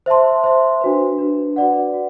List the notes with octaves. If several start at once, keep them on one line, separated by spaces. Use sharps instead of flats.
C5 E5 A5 C6
C5 E5 A5 C6
D4 F#4 B4
D4 F#4 B4
F#4 B4 D5 F#5
F#4